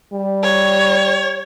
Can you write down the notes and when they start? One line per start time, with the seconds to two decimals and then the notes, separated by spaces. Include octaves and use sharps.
0.13 G3
0.43 C#5